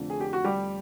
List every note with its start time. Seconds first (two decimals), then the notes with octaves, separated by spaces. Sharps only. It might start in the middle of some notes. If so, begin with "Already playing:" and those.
Already playing: F1 F2 D3 F3
0.10 G#4
0.20 G4
0.33 F#4
0.44 G3 G4